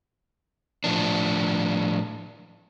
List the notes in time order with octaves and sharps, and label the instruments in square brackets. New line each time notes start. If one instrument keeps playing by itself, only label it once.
[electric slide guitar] A2 F3 D4